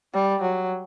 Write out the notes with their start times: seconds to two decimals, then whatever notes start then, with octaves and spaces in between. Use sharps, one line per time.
0.13 G3
0.42 F#3